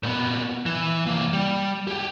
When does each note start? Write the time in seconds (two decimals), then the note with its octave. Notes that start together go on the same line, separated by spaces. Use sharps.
0.03 A#2 B3
0.66 E3
1.07 C2 A#3
1.33 G3
1.87 G4 G#4